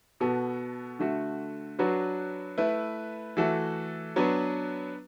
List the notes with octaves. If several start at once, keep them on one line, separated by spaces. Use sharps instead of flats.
B2 B3 F#4 A4
D3 A3 F#4
F#3 D4 F#4 B4
A3 E4 B4
E3 A3 F#4 A4
F#3 B3 D4 B4